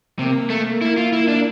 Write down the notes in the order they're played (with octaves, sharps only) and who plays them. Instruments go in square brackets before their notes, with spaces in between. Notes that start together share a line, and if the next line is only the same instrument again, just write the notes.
[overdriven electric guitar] C3 [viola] A#3
[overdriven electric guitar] A3
[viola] A#3 [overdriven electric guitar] E4
[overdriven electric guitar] F4
[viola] A#3 [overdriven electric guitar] E4
[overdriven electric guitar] D4